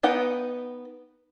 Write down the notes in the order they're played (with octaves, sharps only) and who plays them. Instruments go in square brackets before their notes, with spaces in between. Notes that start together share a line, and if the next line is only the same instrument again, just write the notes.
[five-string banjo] B3 D#4 B4 F#5 G5